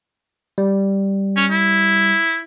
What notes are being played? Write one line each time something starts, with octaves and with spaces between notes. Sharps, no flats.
G3
C#4
E4